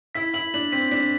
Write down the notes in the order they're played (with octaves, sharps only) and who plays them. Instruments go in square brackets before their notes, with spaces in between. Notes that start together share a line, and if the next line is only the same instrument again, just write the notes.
[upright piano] E4 [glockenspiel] B6
[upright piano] E4 [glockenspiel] F#7
[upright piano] D4 [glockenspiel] F#7
[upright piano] C4 [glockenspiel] B6
[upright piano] D4 [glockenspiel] B6